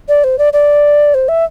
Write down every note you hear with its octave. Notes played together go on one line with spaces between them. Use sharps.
D5
C5
D5
D5
C5
E5